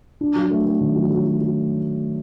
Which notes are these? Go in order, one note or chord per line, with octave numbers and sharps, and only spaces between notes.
D4
F#3
A3
A3
D#3
F#3
F#3
F#3
F#3